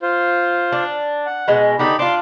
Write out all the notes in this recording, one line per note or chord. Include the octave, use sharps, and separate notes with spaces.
F4 C5
D4
F#5
B2 G#3
D3 B3 D#4 G4 B5
D4 F4 C6 D6